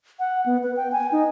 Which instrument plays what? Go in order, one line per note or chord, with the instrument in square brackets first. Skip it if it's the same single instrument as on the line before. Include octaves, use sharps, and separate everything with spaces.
[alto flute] F#5
B3
B4
G5
G#5
D#4